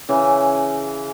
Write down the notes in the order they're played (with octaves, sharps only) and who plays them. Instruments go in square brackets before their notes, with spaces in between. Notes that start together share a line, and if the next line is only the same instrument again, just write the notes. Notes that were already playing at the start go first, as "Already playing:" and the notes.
[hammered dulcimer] C#3 E3